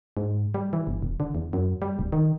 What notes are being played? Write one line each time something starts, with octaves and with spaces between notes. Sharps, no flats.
G#2
G3
E3
G1
E1
D3
E2
F#2
G3
D1
D#3